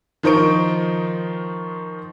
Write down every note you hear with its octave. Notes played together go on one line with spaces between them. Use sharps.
D#3 F3 D#4 C5 C#6 D7